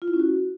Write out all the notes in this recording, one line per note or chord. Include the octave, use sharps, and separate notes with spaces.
F4
E4
C#4
F#4